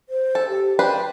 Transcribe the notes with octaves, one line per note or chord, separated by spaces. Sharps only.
C5
A4
G4
D4 B4 C5 G5